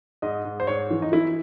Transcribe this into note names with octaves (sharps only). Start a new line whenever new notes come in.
G#2 D#5
G#2
C5
G#2 C#5
E3
D#4
E3 E4